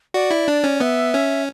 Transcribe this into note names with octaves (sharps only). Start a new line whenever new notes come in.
F#4 D5
E4
D4
C#4
B3 E5
C#4